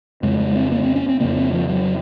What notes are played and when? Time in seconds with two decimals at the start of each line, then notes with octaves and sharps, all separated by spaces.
0.23 F2 C#3 G#3
0.39 G#3
0.56 C4
0.72 A#3
0.83 C4
0.96 C#4
1.09 C4
1.20 F2 C#3 A#3
1.37 C4
1.53 F3
1.70 F#3